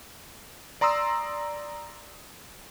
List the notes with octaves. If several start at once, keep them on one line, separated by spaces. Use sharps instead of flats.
D5 A#5 C6 D#6 E6